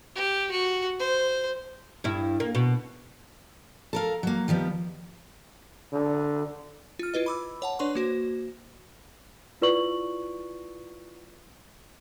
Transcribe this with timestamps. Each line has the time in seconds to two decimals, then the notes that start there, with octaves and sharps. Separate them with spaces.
0.15 G4
0.51 F#4
0.99 C5
2.04 G2 E4
2.40 A#3
2.55 B2
3.93 A4 A#4 F5
4.23 F#3 A#3
4.48 D#3 F3 G3 B3
5.92 D3
6.99 F4 F6
7.14 E4 F4 B4 D#5
7.26 B5 D6 E6
7.62 C#5 F#5 A5
7.79 D4 B4 C#5 D5 C6 C#6
7.95 A#3 F#4 C5
9.61 E4 F4 B4 D5 C#6 F#7